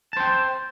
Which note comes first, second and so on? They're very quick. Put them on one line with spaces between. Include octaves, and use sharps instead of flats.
A5 C5 G5